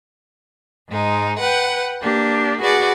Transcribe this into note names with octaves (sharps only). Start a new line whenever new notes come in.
G#2 G#3 D#4
B4 F#5 G5
A#3 D4 G4
F#4 G#4 B4 D5 F#5